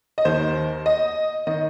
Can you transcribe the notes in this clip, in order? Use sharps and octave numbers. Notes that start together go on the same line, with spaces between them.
D#5
D#2 D#3 C5
D#5
D#3 D#5